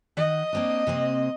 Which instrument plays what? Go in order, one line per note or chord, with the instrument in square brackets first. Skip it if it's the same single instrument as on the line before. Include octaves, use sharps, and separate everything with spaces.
[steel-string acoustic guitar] D#3 F#5 [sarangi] D#5
[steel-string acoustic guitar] A#3 C4 D4
C3 A#3 C4